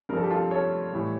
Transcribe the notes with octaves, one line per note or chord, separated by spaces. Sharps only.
G2 F3 A4 A#4
G4
F4 A4
A4 C#5
A2 E3 G3